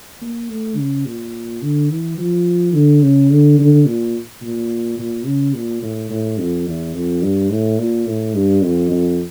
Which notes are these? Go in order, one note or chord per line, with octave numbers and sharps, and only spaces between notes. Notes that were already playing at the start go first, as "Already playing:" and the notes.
A#3
A3
C#3
A#2
D3
E3
F3
D3
C#3
D3
D3
A#2
A#2
A#2
C#3
A#2
A2
A2
F2
E2
F2
G2
A2
A#2
A2
G2
F2
F2